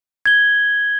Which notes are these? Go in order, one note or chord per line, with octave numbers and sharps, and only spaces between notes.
G#6 G7